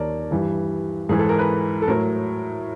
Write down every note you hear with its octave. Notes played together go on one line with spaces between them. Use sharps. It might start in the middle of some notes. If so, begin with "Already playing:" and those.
Already playing: D#2 D#3 A#4 C#5 D5 A5
G2 E3 G3
G#2 E3 G#3 G#4
A4
A#4
B4
A4
A2 F#3 A#4